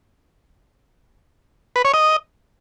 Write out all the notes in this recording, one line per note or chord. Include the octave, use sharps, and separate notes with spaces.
B4
C#5
D#5